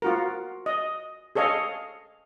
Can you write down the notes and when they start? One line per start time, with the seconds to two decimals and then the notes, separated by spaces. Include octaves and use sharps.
0.02 F4 F#4 A#4
0.66 D#5
1.35 G#4 A4 C#5 D#5 F5